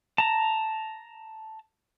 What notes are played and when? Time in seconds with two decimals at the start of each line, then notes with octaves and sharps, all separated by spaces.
0.18 A5 A#5